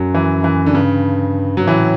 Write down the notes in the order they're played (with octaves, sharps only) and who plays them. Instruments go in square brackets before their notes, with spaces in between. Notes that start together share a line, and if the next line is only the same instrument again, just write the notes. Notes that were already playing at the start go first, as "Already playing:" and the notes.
Already playing: [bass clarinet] F#2 [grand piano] F#3
[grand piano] E3
E3
D3
[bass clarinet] G2 [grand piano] C#3
[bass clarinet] G2 [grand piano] F#3
[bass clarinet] A2 [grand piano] E3